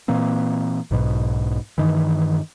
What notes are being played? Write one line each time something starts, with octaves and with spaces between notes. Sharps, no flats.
A#2 E3 A#3 C4
B1 G#2 B2
G2 D#3 E3